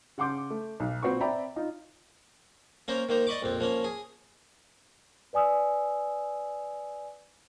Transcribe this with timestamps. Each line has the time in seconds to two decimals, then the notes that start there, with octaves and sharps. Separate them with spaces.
0.18 C#3 F#5 C6 D6 G6
0.50 A3
0.80 B1
1.03 A#2 C4 F#4 B4 C#6
1.21 C4 D5 E5 G5 A#5 B5
1.56 D#4 F4
2.88 A#3 C#4 A#4 C5
3.09 D#3 A#3 C5
3.27 D5 D#5 B5 C#6 D6
3.42 A#1 F2 C4
3.60 F3 A#3 C#4
3.84 G#4
5.33 B4 D5 G#5 D#6 E6